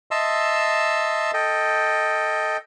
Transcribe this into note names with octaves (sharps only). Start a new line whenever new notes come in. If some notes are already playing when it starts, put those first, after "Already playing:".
D#5 E5 A5 C6 E6
A4 D#5 G5